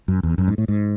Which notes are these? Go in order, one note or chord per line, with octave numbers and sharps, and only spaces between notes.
F#2
E2
F#2
G#2
A2
G#2